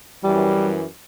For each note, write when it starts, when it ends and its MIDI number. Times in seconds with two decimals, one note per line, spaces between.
0.24 0.83 42
0.24 0.83 52
0.24 0.74 55